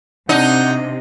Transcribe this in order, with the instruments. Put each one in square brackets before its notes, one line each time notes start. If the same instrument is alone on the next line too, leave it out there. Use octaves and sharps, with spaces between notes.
[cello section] C3 [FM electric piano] D4 [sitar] D#4 [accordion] F#5 G6